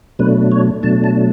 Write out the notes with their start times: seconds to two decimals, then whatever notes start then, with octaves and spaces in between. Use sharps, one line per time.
0.19 B2 F#3 A3 D4 B4
0.52 C#5
0.83 B2 F#3 A3 D4 A5
1.04 A5